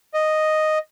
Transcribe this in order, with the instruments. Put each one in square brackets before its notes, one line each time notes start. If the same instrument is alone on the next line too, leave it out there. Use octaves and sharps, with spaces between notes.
[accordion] D#5